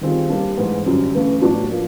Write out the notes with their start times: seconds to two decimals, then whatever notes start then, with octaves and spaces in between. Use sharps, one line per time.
0.01 D#3 G3 C4 F4 G#4
0.30 G3 A#3 D4
0.57 G#2 E3 A3
0.86 F#2 D3 G3
1.14 C#3 E3 A3
1.42 A2 F#3 B3 D4
1.70 F3 A#3